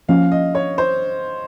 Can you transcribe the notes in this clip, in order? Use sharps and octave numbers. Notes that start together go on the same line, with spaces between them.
F3 A#3 C#4 F5
D#5
C#5
C5